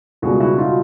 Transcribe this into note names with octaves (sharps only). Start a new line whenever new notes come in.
C#2 B2 G3 F#4 G#4
E4 F#4
D#4 F4